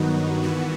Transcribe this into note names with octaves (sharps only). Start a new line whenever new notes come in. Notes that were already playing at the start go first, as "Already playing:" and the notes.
Already playing: G2 D#3 F#3 B3 D#4 F#4
G2 E3 B3 F#4